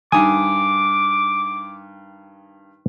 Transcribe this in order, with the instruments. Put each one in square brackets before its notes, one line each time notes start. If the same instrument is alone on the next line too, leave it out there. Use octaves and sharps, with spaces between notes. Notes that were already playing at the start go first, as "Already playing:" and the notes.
[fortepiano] G2 D#3 D#6 [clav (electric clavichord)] G#5 [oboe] D6